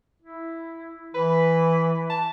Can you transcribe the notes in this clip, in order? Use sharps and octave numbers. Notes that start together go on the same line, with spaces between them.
E4
E3 B4
A5